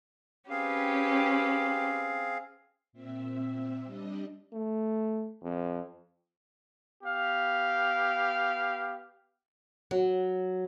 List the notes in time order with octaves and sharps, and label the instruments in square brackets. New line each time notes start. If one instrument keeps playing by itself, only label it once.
[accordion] C4 G#4 F5 [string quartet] C#4 G4 B4
[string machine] A#2 C4 E5
G3 D4 D#5
[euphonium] A3
F2
[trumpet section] B3 G4 F5
[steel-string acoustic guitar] F#3